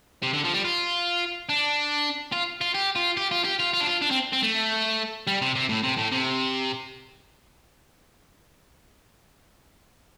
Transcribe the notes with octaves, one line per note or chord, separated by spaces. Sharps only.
C3
D3
F3
G3
F4
D4
F4
F4
G4
F4
G4
F4
G4
F4
F4
D4
F4
D4
C4
C4
A3
G3
C3
C3
A2
C3
A2
C3